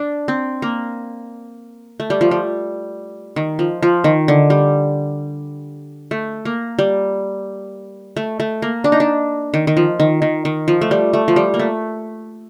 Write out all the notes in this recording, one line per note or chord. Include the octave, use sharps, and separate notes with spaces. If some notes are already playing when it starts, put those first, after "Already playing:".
Already playing: D4
C4
A#3
A3
G3
F3
G3
D#3
F3
F3
D#3
D3
G3
A3
A#3
G3
A3
A3
A#3
D4
D#4
D4
D#3
D#3
F3
D#3
D#3
D#3
F3
A3
G3
A3
F3
G3
A#3
A3